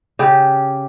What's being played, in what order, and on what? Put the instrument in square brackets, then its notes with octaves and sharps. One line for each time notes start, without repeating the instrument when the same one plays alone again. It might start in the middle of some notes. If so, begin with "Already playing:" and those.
[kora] C#3 G4